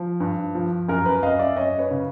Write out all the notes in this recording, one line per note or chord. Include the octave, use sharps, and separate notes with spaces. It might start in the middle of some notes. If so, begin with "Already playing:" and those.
Already playing: F3
G2
F3
F#2 A#4
B4
F#2 D#5 F5
D5 E5
F#2 C#5 D#5
B4 C#5
C#3